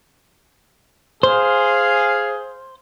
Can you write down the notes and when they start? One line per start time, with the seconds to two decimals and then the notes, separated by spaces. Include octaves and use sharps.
1.23 G#4 C5 F5